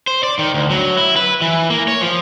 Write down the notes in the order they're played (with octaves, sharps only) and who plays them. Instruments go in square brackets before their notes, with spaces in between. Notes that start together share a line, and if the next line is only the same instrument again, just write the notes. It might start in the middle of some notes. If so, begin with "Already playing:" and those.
[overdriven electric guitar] C5
D5
D#3
D2
F#3
E4
B4
E3
A#3
C#5
F3